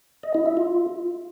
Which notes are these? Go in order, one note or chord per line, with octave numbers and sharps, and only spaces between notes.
D#5
E4
E5
F4